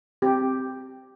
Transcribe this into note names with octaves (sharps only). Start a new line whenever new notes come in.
C4 G4